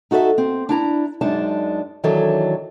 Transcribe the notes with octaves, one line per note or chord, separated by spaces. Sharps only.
D#4 F#4 A4 C5 E5
C4
D4 E4 A#5
F#2 G#3 D4 D#4 A5
D#3 E3 F#3 D4 A4 C#5